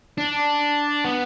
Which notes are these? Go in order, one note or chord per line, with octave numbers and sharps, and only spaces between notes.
D4
B3